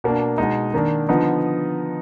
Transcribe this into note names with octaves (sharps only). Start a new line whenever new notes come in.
B2 A#3 D4
B2 G#3 D#4
D#3 A#3 D4
D3 F3 B3 D#4